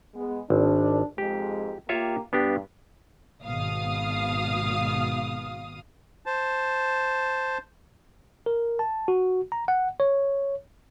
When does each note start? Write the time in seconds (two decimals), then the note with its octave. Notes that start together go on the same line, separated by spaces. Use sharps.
0.15 G#3 B3
0.50 G#1 D4
1.18 F2 G#2 G#3 G4
1.89 A#3 F4 G4 C#5 E5
2.33 G2 B3 D4 G4
3.44 G#1 B2 F5 D#6
6.26 C5 A5
8.46 A#4
8.79 A5
9.08 F#4
9.52 A#5
9.68 F#5
10.00 C#5